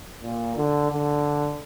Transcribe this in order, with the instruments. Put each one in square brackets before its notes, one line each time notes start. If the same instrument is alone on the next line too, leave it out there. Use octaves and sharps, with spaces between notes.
[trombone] A#2
D3
D3